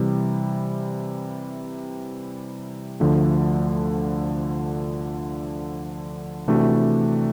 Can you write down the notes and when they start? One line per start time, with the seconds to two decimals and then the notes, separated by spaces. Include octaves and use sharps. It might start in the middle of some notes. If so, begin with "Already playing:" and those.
Already playing: C3 E3 G3
3.00 D2 D3 F3 A3
6.48 C3 E3 A3 D4 F#4